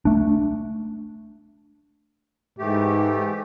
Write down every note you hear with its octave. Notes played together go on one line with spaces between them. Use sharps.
A3 D4
G#2 E3 A3 G4